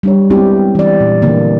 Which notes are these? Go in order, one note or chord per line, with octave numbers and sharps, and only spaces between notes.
G3 D4 C#5
G#3 B3 C4 D4 E4 G4
E3 D5
A#2 G3
D3 E3 A#3